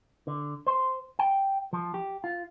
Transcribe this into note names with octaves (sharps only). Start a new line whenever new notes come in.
D3
C5
G5
F3
G4
F4